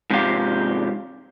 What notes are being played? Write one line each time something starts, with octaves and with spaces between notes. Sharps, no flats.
G#2 C3 F3 G4 F5